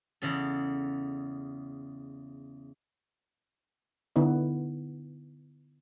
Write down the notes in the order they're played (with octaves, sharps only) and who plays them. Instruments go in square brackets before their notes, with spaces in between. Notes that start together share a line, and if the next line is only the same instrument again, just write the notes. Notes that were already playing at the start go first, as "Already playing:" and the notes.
[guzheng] E2 C#3 A4
[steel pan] D3 B3 D#4 E4